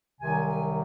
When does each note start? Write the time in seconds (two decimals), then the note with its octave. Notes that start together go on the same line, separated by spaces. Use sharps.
0.21 C2 C3 D#3 F#3 G#5
0.47 G#5